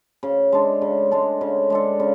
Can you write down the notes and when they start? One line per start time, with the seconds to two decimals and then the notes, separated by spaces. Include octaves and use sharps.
0.23 C#3
0.52 G#3 D4 A4
0.82 C#3
1.11 G#3 D4 A4
1.41 C#3
1.70 G#3 D4 A4
2.00 C#3